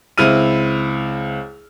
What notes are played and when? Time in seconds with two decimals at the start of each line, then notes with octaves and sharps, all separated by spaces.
0.18 C#2 C4 E4 F6 D#7